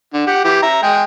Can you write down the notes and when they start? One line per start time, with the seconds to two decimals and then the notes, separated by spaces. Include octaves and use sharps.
0.13 D3
0.27 G4 F#5
0.44 E3 G4
0.63 E5 A#5
0.83 G#3 G#4 G5